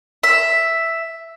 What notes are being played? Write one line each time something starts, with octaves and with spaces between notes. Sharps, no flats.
E5